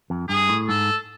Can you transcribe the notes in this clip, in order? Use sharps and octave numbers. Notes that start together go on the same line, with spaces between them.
F2
G2 G#4
A2
G#2 A4